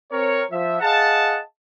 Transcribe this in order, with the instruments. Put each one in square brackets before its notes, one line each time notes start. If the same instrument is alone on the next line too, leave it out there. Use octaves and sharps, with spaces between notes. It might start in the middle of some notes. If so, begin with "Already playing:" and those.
[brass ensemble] C4 A#4 C#5
F3 E5
G#4 D#5 F5 F#5 A5